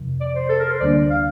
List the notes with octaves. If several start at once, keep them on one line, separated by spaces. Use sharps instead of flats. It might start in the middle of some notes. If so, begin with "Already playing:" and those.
Already playing: F2 C3 F3
D5
C5
A4
A#4
C5
D2 D3 G3 A#3 D4 D5
F5